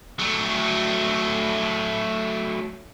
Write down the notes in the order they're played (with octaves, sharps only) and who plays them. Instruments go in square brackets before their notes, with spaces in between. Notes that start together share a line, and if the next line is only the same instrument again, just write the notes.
[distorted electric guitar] F#3 A3